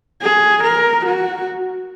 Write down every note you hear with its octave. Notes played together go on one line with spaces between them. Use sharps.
G#4
A#4
F#4